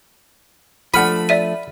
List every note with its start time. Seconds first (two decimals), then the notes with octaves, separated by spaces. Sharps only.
0.94 F3 A3 D4 F#5 B5 F6 D#7
1.29 D5 E5 D#7